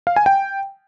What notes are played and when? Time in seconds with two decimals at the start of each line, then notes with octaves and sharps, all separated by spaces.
0.07 F5
0.16 G#5
0.26 G5